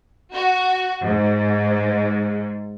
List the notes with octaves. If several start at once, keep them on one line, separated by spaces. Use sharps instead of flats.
F#4
G#2